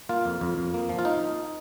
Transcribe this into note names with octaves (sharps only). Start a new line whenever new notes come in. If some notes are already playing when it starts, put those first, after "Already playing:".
A#3 F4
F2
F2
F2
A#3
F3
F4
D#4